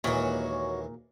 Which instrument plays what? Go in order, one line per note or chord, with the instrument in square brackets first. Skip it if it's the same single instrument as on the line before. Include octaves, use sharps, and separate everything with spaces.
[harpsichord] D#2 E3 G#3 [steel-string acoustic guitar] A#2 [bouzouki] F#4 C#5